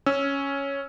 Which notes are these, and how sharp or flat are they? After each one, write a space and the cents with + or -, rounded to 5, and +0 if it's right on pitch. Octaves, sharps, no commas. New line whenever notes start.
C#4 +0 E6 +0